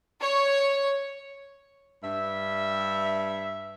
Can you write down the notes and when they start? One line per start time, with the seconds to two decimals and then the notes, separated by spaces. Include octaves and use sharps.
0.20 C#5
2.03 G2 E5